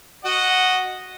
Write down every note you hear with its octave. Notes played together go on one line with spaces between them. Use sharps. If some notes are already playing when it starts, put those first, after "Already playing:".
F#4 D#5 F#5